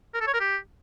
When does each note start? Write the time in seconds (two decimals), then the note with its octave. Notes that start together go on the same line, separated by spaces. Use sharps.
0.14 A#4
0.21 A4
0.27 C#5
0.34 A#4
0.40 G4